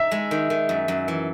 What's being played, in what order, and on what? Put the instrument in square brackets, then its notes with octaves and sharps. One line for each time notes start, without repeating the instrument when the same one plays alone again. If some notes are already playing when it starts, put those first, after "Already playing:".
Already playing: [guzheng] D#4 [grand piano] E5
[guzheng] G#3
D#3
D#3
F#2
F#2
E3